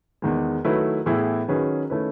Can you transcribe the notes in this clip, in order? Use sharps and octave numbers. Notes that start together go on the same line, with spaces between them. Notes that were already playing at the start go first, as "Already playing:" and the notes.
E2 D#3 G#3
D#3 F#3 A3 E4 B4
A2 E3 B3 E4 G#4
D#3 F#3 C#4 G#4 B4
D#3 A3 C#4 E4 B4